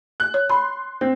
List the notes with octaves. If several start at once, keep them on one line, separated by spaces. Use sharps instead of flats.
F#6
C#5
B5 C6
C4 C5